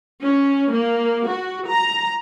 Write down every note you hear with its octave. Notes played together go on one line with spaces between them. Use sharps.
C#4
A#3
F#4
A#5